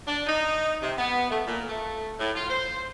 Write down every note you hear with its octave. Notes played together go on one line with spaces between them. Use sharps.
D4
D#4
C3
B3
A3
A#2
A3
A2
F4
C5